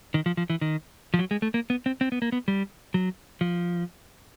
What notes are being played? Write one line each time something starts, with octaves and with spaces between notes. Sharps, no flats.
D#3
F3
F3
E3
D#3
F3
F#3
G#3
A3
A#3
B3
C4
C4
B3
A#3
B3
G3
F#3
F3